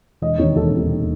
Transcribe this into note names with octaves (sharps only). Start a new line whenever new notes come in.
E1 D#5
D#2 D#3 C#5
E1 A4
D#2 D#3
E1